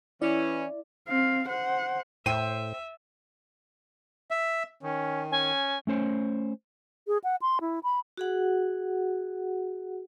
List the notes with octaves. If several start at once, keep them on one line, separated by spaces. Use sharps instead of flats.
E3 C#4 E4 D5
C4 F5
C5 F#5
A2 C5 E5 G5 D#7
E5
D#3 C#4
C#4 G#5
A3 C#4 C5 C#5
G#4
F#5
C6
E4
B5
F#4 G#4 F#5